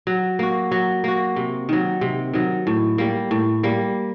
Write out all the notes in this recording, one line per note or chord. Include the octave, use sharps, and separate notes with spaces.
F#3
A#3 F#4
F#3
A#3 F#4
C3
D#3 F#3
C3
D#3 F#3
A2
G3 A#3
A2
G3 A#3